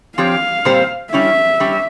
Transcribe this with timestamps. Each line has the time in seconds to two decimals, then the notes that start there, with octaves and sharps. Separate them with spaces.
0.18 F3 C4 G4 C#5 F5
0.65 A#2 G3 C4 G4 C5
1.13 G3 C#4 E4 E5
1.60 G3 C#4 G4